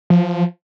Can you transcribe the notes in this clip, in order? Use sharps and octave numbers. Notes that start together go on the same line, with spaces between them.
F3